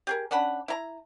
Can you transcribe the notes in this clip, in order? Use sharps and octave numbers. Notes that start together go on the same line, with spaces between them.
G4 G#4 A#4
C#4 D4 F#5 B5
E4 A#5